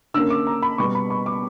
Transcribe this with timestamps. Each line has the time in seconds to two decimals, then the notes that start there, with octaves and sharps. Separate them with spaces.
0.14 D3 A#3 C#4 E6
0.30 D6
0.47 A#5
0.62 B5
0.78 B2 G3 B3 C#6
0.95 B5
1.10 C#6
1.26 D6